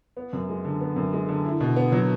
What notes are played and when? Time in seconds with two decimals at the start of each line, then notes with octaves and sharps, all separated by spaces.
0.17 B3
0.33 F#2
0.49 G#3
0.65 D3
0.81 B3
0.96 F#2
1.13 G#3
1.29 D3
1.45 E4
1.60 B2
1.76 B3
1.92 F#3